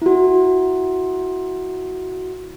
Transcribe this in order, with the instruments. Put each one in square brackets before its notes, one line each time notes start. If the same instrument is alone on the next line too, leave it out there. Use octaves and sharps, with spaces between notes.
[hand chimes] E4 F#4